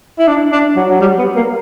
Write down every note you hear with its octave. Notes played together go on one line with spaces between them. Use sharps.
E4
D4
D4
F#3
F#3
G3
B3
A#3